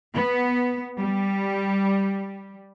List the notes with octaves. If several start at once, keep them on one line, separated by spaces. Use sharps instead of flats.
B3
G3